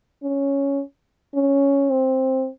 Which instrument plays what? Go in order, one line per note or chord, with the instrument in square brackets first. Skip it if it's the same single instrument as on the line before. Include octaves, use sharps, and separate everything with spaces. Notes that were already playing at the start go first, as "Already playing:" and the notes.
[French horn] C#4
C#4
C4